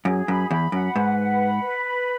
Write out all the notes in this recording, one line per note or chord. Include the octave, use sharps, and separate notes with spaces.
F#2 G#4
F#2 B5
E2 B5
F#2 F#5
G#2 B4
F#5
B5
B4
B5